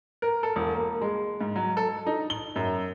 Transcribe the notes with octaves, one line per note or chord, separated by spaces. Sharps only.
A#4
A4
E1
A#3
G#3
G#2
F#3
A4
D#4
G7
F#2